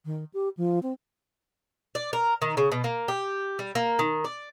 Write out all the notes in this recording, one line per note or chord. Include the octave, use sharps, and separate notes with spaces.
D#3
G4
F3
C4
D5
A#4
D#3
C#3
B2
A#3
G4
G3
A#3
D#3
D5